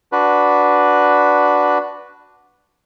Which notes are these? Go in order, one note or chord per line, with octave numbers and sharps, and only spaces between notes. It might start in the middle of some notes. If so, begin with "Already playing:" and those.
D4 F#4 B4